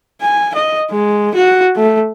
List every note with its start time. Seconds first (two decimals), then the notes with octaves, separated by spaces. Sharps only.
0.21 G#5
0.55 D#5
0.91 G#3
1.35 F#4
1.76 A3